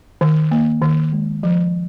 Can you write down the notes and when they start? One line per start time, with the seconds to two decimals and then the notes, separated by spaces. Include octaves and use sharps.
0.21 D#3
0.51 A#3
0.82 D#3
1.12 G#3
1.43 F3